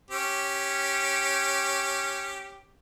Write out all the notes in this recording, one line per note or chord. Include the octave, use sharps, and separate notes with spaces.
C#4 G4